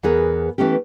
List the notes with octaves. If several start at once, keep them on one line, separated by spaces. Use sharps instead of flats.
E2 B3 G#4 A#4
E3 A3 B3 C#4 G4